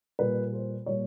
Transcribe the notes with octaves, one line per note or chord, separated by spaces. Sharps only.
A#2 G3 B4
C5
A#2 G3 C#5